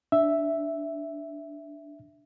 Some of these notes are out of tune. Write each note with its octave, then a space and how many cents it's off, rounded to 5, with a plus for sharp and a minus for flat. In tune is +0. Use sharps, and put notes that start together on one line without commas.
D4 +0 E5 +0